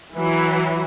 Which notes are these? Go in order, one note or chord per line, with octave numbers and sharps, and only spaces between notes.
E3 F#3 E4 F#4